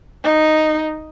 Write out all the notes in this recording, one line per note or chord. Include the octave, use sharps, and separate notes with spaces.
D#4